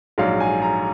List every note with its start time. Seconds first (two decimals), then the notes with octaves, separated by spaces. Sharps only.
0.18 A#1 G#2 F#3 F5
0.40 G#5
0.62 A#5